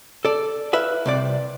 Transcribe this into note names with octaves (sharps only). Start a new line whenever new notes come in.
A4 D5
E4 B4 E5 F5
C2 C3 D5